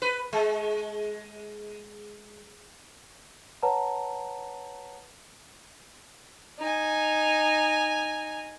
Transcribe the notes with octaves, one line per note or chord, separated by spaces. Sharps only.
B4
G#3
B4 C#5 F#5 A5 A#5
D#4 G#5